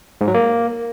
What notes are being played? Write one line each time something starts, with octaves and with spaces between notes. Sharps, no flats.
G#2
F#3
A#3